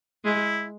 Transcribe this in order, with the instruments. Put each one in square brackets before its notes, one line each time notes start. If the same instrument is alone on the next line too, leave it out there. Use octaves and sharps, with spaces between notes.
[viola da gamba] G#3 [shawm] E4